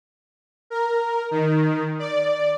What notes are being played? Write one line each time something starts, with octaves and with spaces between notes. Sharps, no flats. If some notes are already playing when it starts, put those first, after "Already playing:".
A#4
D#3
D5